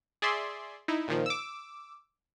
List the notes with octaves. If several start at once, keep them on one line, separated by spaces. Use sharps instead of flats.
G#4 D5 E5 C6
D#4 E4
A#2 D#3 F3
D6 E6